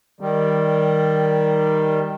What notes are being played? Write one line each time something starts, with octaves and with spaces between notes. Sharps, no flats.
D#3 G3